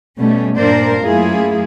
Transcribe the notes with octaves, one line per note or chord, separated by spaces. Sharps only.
B2 G3 A3 C#4
G2 A#2 D4 A#4 C5 D5
F#2 A3 A#3 E4 F4 G#4